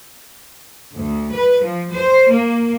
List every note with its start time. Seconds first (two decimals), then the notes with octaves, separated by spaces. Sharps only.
0.96 D2
1.31 B4
1.62 F3
1.93 C5
2.29 A#3